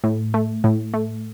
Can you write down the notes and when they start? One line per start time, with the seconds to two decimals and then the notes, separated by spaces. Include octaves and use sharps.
0.04 A2
0.34 A3
0.64 A2
0.94 A3